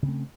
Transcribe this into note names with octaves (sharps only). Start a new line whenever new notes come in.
C#3 A3 C4